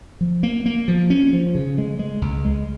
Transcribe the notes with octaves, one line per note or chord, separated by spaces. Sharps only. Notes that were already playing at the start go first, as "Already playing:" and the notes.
F3
A#3
A#3
F3
C#4
F3
C#3
G#3
G#3
C#2
G#3